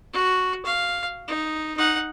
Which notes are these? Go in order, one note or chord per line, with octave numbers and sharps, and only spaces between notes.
F#4
F5
D#4
D#4 F#5